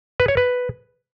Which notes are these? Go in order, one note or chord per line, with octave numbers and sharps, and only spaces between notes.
B4
C#5
B4